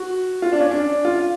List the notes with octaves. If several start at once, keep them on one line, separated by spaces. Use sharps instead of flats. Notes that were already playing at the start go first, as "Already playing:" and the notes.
Already playing: F#4
F4
D4
C#4
D4
F4